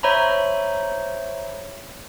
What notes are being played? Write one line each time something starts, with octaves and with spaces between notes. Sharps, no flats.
C5 C#5 E5 A#5 B5